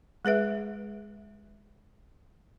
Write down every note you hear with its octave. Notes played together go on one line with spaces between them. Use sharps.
G#3 G#4 B4 E5